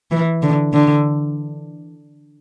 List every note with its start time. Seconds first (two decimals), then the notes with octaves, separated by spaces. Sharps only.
0.11 E3
0.42 D3
0.73 D3